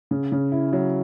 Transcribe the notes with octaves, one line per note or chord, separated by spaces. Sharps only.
C#3
C#3
E4
F#3